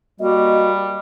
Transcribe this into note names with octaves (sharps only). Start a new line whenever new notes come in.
G3 A#3 F#4 D#5